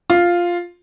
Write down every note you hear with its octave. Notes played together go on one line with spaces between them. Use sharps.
F4